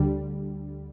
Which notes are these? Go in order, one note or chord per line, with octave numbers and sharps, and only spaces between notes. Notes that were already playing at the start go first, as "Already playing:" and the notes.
Already playing: D2 D3 G3